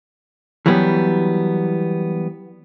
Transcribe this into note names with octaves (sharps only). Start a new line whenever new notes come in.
E3 F#3 G3 B3